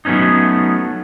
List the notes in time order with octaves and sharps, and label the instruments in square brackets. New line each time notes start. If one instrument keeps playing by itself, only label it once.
[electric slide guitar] F#3 A3 B3 C#4 D#4